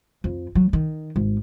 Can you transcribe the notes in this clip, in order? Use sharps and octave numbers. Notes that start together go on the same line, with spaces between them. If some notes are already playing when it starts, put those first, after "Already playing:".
F2
F#3
D#3
G#1